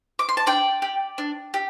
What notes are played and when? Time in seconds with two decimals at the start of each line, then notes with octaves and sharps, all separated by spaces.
0.19 D6
0.29 C6
0.37 A5
0.46 D4 D5 G5
0.82 G4
1.18 D4
1.54 G4